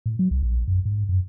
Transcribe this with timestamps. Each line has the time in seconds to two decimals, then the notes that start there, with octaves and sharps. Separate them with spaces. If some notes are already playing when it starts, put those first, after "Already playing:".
0.06 A2
0.19 F#3
0.31 C2
0.43 A#1
0.68 F#2
0.85 G#2
1.09 F#2